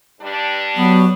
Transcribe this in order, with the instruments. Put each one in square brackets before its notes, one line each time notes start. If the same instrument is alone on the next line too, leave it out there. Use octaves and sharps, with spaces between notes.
[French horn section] G2 G3 D4
[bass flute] F#3 [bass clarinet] B3